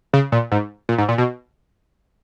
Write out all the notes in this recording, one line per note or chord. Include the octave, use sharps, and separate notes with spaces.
C#3
A#2
G#2
A#2
G#2
A#2
B2